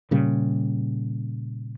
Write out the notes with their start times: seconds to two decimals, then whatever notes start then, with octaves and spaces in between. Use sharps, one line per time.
0.11 A#2 C#3 G3